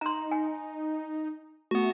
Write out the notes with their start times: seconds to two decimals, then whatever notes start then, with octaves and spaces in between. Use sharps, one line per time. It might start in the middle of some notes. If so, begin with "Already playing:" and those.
0.01 D#4 A#5 C6
0.32 G#5
1.71 A3 B3 F#4